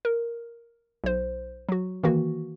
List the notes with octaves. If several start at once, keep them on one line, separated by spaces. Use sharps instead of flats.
A#4
B1 C5
F#3 F#4
D#3 E3 A#3 F#4